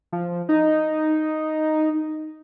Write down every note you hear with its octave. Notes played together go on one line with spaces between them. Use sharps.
F3
D#4